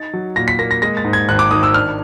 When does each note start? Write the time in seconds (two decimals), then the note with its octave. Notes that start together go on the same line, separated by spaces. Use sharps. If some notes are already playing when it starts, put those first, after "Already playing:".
Already playing: D#4 A6
0.14 F#3
0.36 A#2 A#6
0.48 B6
0.59 A#3 A#6
0.71 A#6
0.82 G#3 A#6
0.97 A6
1.04 G#2
1.13 G#6
1.29 G#1 F#6
1.39 D6
1.51 D#3 D#6
1.63 E6
1.74 D4 F6